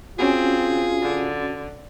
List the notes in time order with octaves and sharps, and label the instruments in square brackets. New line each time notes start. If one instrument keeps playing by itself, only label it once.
[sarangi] C4 [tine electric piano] C#4 F#4 [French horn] F4 [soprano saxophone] G#4
[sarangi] D3